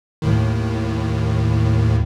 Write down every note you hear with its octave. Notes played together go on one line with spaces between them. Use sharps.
D#2 A2 D#3